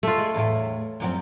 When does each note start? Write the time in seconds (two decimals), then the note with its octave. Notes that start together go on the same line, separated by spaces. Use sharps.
0.03 A3 F4
0.18 G#3
0.34 E2 A2 E4
1.00 F#2 F3 C4